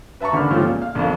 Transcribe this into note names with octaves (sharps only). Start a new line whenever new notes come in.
B4 E5 A5 A#5 C#6
D#2 D3 D4 B5 F6
F3 G#3 A3 C#4 F4 G4
A#2
F5
A#1 F2